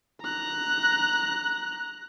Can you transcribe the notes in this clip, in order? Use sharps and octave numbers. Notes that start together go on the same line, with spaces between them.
A#5 F#6